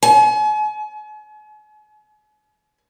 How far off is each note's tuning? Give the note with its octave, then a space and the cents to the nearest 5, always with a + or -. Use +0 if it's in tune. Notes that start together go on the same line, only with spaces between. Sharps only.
G#5 +40